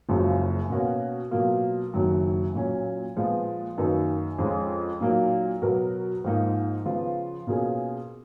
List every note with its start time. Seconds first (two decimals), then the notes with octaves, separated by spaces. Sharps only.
0.09 F#1 F#2 C#3 F3 G#3
0.70 B2 A#3 C#4 F#4
1.31 B2 F#3 A#3 F4
1.94 F#1 F#2 D#3 F#3
2.54 A#2 F#3 C#4
3.17 A#2 F3 G#3 B3 F4
3.77 F#2 D#3 A#3 D#4 A#4
4.39 F2 F3 G#3 C#4
5.01 A#2 F#3 A#3 D#4
5.62 B2 F#3 B3 F#4 A#4
6.24 G#2 F3 A#3 D#4
6.85 C#3 F3 B3 F4
7.47 B2 A#3 C#4 F4 G#4